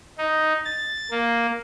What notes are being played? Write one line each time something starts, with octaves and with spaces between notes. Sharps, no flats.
D#4
A6
A#3